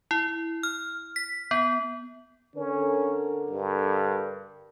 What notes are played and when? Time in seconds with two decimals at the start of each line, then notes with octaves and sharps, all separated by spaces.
0.11 E4
0.63 F6
1.16 B6
1.51 B3
2.56 D3 C#4 A#4
3.50 G2